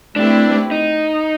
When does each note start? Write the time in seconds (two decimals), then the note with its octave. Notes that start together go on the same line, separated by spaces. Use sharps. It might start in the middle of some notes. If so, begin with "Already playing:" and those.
0.16 A3 C4 D4 E4 G4 B4
0.71 D#4